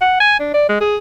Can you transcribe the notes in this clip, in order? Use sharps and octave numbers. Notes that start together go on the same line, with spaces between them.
F#5
G#5
D4
D5
G#3
G#4